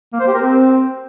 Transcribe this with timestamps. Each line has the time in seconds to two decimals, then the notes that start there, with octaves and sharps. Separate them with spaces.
0.13 A#3
0.20 C5
0.27 G4
0.34 A#4
0.41 C4